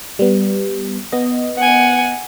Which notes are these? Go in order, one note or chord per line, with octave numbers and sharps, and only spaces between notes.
G3 B3
B3 D#5
F#5 G#5